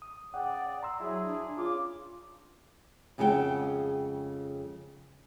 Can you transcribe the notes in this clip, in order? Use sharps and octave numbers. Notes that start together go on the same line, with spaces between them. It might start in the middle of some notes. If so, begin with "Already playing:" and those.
D#6
C#3 D5 F#5 G5 D#6
A#5 C6 E6
F#3 E4 G#4
D4
C#3 F4 D6
F2 C#3 G#3 G#4 F#5 G5